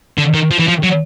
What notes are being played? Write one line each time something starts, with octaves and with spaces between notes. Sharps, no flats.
D3
D#3
F3
E3
F3
F#3